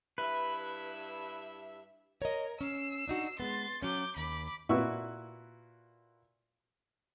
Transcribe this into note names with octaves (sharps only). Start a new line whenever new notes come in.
G2 E4 B4 E5
A#4 C#5 D#5
C#4 E6 C7
D4 D#4 F#4
G#3 B3 C6 A6
F#3 C#4 D6 G6
D#2 B5 D6
A#2 E4 F#4 B4 C#6 E6